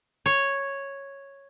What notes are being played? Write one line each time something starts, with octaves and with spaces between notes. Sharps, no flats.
C#5